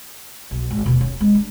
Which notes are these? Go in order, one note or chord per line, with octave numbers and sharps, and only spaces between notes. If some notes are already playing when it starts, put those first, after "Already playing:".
B1
G#1
D#1 B2
C#4 D#4
G#3 C4
D4